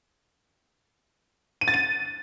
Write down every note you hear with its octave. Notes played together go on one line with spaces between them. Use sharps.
D#7
A6
D#7